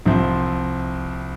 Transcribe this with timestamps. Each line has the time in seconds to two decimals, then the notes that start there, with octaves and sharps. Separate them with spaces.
0.06 C2 C3 F3 C4